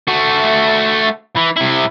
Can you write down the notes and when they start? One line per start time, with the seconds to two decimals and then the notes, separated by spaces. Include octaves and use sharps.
0.08 A3 F#4
1.36 E3
1.56 C3 E4